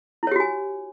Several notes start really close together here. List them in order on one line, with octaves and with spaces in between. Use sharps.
E4 C#5 G4 F#4 G#5